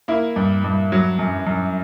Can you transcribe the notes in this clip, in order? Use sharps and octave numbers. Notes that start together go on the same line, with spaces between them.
A#3 E4
G2
G2
F#3
F#2
F#2